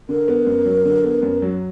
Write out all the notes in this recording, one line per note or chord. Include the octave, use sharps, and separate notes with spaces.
D3 A#4
B3
F#2
F#3
D3
B3
F#2
F#3